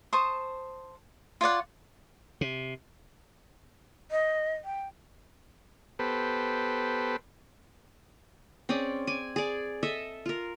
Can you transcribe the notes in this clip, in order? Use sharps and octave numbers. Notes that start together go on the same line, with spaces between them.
C5 A5 C#6 D#6
F4 C#5 D5 F#5
C3
D#5
G5
B3 G4 A4 B4 C5
C4 C#4 G#4 D5
D5 G#5
G#4 D5
A4 D#5 E5
F4 A#4